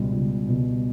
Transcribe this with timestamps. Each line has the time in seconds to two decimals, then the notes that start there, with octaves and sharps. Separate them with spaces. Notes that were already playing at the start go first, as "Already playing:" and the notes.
Already playing: C#2 B2 G3
0.12 C#2
0.48 B2 G3